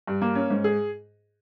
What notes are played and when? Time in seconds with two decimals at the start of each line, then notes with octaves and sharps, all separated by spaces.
0.07 G2
0.22 A#3
0.35 C#4
0.50 G#2
0.64 G#4